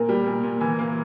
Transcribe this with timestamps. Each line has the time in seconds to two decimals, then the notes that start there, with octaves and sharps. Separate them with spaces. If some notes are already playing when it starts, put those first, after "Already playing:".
Already playing: A#2 A#4
0.09 G3
0.26 A#2
0.43 A#2
0.61 E3
0.79 A#3